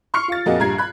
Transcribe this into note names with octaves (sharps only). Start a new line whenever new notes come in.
C6 C#6 F6 C7 C#7
F4 A6
F2 A#2 A#3 F#4 G#4 D#5
A#1 G2 A#5 G#6 C7
B5 F#6